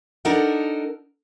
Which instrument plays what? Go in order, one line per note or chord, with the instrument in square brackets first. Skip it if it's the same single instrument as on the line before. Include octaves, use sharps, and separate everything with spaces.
[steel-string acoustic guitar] D4 D#4 A4 A#4 F#5